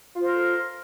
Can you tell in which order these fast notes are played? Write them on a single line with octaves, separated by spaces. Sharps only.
F4 C5 A#4 A4